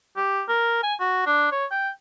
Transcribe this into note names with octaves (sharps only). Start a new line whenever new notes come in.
G4
A#4
G#5
F#4
D4
C#5
G5